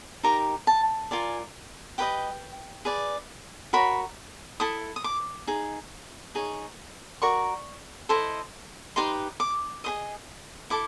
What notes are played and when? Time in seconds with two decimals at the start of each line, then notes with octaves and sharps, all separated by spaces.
0.23 D#4 G4 A#4 A#5
0.67 A5
1.11 F4 A#4 D5 G#5
1.98 G4 B4 D#5 G5
2.85 G#4 B4 D5
3.73 F#4 A#4 C#5 B5
4.60 E4 A4 D#6
4.96 D#6
5.04 D6
5.47 D#4 G#4
6.35 D#4 G#4 C#5
7.22 F#4 A#4 D5 C#6
8.09 E4 A4 C5 D#5
8.96 D#4 G4 B4 D#5 C6
9.40 D6
9.84 G#4 C5 D#5 D#6
10.70 E4 A4 D6